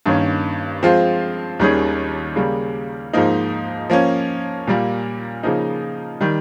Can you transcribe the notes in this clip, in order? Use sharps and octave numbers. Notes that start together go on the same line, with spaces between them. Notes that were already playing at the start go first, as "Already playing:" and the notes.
G2 D#3 A#3 C#4
F3 G#3 C4 F4
D#2 D#3 G3 C#4 G#4
C#3 G3 A#3
G#2 F3 A#3 D#4
F3 A#3 C#4
A#2 G3 A#3
C#3 F3 A#3 D#4
D#3 G3